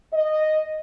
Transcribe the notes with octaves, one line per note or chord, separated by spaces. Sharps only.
D#5